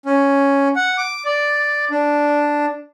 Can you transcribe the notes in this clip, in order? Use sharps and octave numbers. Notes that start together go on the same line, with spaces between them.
C#4
F#5
D6
D5
D4